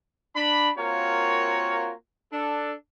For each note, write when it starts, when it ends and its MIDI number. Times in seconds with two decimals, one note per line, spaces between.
0.35 0.70 62
0.35 0.70 83
0.77 1.92 58
0.77 1.92 60
0.77 1.92 65
0.77 1.92 66
0.77 1.92 70
0.77 1.92 73
2.32 2.73 62
2.32 2.73 69